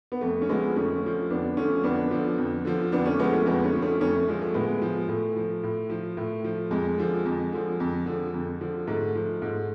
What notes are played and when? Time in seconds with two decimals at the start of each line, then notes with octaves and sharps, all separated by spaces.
0.12 B3
0.21 F2 A3
0.42 C#4
0.49 D3 F3 G#3 B3
0.76 F2 A3 C#4
1.03 D3 F3
1.30 F2 B3 D4
1.57 D3 F3 A3 C#4
1.84 F2 B3 D4
2.11 D3 F3
2.38 F2
2.65 D3 F3
2.92 F2 B3 D4
3.06 A3 C#4
3.19 D3 F3 G#3 B3
3.33 A3 C#4
3.46 F2 G#3 B3
3.64 A3 C#4
3.73 D3 F3
3.82 A3 C#4
4.00 F2 A3 C#4
4.14 A3
4.28 D3 F3 G#3
4.42 A3
4.54 A2 G#3 B3
4.82 F3
5.08 A2 A3
5.36 F3
5.63 A2
5.90 F3
6.17 A2 A3
6.44 F3
6.71 F2 G#3
6.98 D3 F3
7.25 F2
7.52 D3 F3
7.80 F2
8.06 D3 F3
8.34 F2
8.61 D3 F3
8.87 G#2 A3
9.15 F3
9.42 G#2